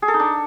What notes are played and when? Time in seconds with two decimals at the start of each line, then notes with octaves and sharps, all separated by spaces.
0.02 G#4
0.08 A4
0.14 D#4
0.20 D4